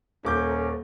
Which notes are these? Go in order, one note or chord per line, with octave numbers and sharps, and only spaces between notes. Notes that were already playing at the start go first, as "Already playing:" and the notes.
D#1 C#4 A4 A#4 C5 D6 G6